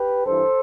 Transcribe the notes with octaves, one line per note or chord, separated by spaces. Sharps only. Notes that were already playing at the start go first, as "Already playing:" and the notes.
Already playing: G4 B4
G2 E3 A4 C5